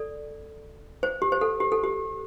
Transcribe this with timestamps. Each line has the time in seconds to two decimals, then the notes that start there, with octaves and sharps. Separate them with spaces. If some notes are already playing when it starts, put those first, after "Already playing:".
Already playing: A4 D5
1.03 C5
1.22 G4
1.32 C5
1.41 A4
1.60 G4
1.72 A4
1.84 G4